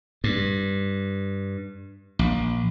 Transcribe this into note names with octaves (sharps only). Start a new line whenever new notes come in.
G2
A#1